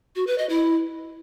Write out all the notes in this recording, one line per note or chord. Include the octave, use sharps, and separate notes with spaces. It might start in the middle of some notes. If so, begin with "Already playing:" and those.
F#4
B4
D#5
E4